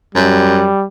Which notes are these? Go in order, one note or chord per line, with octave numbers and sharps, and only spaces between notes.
F#2 G3